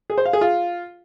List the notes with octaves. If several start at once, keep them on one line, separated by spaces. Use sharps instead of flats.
G#4
C5
F5
G#4
F4